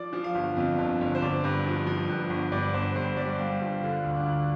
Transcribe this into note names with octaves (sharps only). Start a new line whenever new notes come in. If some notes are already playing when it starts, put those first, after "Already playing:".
Already playing: F3 D5
F3
F5
G1
F2
G1
G1
C5
G1 D5
G2
F3
F3
G2
G1
G2 D5
G1 C5
G2 C5
G3 D5
G3 F5
G1 F4
D3 F4
D2
D4
D2